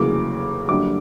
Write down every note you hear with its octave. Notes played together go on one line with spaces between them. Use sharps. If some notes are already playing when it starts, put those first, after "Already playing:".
Already playing: F1 E2 C#3 F#3 A#3 D6
F#2 D3 G3 A#3 D6